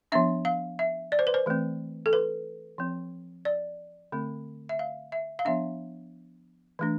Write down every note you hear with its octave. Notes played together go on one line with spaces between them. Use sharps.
F3 B3 D4 E5
F5
E5
D5
C5
B4
C5
E3 A3 C4
A4
B4
F3 C4
D5
D3 A3 C4
E5
F5
E5
F5
F3 B3 D4 E5
E3 A3 D4